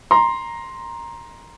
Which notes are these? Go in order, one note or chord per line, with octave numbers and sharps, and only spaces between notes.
A#5 C6